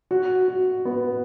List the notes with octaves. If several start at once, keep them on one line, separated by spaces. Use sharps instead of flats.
F#4
F#4
B3